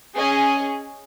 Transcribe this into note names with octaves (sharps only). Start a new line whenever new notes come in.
C#4 G#4 D#5 G#5